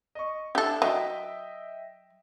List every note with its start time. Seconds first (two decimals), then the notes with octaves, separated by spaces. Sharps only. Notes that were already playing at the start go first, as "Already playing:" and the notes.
0.15 D#5 C#6
0.55 D4 E4 G4 A4
0.82 F#3 D#5 E5 G5